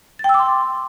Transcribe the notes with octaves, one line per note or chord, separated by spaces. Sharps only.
G5 C6 D6 E6 A6